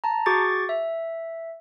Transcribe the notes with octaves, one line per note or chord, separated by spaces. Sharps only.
A5 A#5
F#4 G#4 C#6 D6 A6
E5